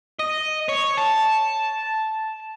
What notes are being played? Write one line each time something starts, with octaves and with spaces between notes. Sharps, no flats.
D#5
C#5
A5